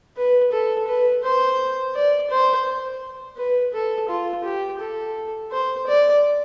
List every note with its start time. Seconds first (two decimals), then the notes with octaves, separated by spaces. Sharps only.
0.17 B4
0.52 A4
0.88 B4
1.23 C5
1.95 D5
2.30 C5
3.37 B4
3.73 A4
4.09 F4
4.44 G4
4.79 A4
5.51 C5
5.87 D5